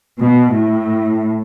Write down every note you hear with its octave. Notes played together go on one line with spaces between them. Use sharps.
B2
A2